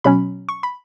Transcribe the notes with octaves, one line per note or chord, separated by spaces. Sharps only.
B2 F#3 C#4 B5
C#6
B5